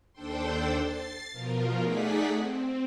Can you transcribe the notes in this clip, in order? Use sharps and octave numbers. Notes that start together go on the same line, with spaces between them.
D#2 D4 A4 C5 G5 C6
A6 C7
B2 F3 F4 A#4
A3 D#4 G#4 D5 F#5 B6
C4